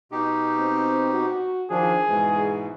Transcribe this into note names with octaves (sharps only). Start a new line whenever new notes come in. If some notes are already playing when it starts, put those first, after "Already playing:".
B2 D#4 G4
C4
F#4
D#3 F3 D4 G#4
G#2 B2 E3 G#3